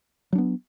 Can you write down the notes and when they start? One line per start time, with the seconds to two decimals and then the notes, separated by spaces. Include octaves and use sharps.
0.33 F#3
0.35 D4
0.38 B3